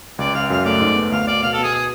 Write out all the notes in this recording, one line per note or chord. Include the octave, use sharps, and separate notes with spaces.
C#2 D5
C#2 F5
F#2 F5
A3 D5
G#2
B3
D2 F5
B3 D5
B2 F5
A4
B2 G#4
G#4